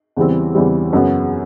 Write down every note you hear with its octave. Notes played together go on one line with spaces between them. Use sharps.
E2 C#3 E3 G3 C4
E2 C#3 E3 G3 C4
F#2 C#3 F#3 B3